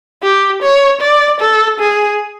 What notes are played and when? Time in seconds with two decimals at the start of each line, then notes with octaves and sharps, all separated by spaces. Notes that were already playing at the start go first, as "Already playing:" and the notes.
0.23 G4
0.63 C#5
1.01 D5
1.41 A4
1.80 G#4